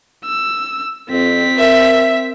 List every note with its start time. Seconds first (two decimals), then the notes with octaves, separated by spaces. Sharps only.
0.25 E6
1.09 F2 C4 B6
1.58 A#4 E5